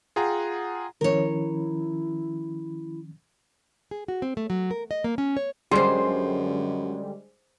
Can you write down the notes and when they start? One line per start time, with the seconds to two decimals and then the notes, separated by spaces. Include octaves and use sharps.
0.16 F4 G#4 F#5 G5 A#5
1.01 D#3 F3 C#4 E4 A#4 C#5
3.91 G#4
4.08 F#4
4.22 C4
4.37 A3
4.50 F#3
4.71 A#4
4.91 D#5
5.04 A#3
5.18 C#4
5.37 C#5
5.71 F#2 D3 G3 G#3 G#4 C5 C6